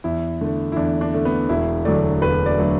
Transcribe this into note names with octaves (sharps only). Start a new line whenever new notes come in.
E2 E4
D3 A3
E4
E2 D4
D4
D3 A3
B3
E1 E4
D2 D3 F#3 A3 D5
E1 B4
D5
D3 F#3 A3